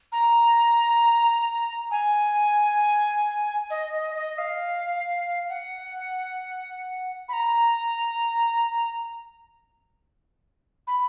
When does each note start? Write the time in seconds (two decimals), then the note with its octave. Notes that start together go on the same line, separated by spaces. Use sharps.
0.12 A#5
1.91 G#5
3.70 D#5
3.93 D#5
4.15 D#5
4.38 F5
5.50 F#5
7.29 B5
7.33 A#5
10.87 B5